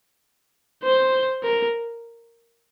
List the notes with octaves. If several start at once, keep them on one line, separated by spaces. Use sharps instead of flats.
C5
A#4